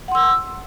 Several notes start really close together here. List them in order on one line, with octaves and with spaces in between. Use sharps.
F#5 C6 E6